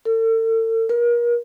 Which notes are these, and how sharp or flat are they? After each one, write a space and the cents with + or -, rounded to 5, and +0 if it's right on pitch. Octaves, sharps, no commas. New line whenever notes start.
A4 +40
A#4 +35